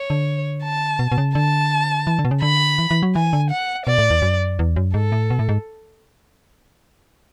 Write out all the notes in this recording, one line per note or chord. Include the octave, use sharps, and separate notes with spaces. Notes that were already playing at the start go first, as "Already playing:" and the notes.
Already playing: C#5
D3
A5
B2
B2
C#3
D3 A5
E3
D3
B2
C#3
D3 B5
E3
E3
F#3
E3 G#5
D3
F#5
B2 D5
A2
E2
F#2
E2
F#2
G#2 A4
A2
B2
A2
G#2